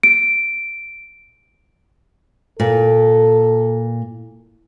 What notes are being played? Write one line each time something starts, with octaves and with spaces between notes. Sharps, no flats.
D7
A#2 A4